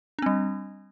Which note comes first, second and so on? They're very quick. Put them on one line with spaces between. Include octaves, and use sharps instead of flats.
D4 C4 G3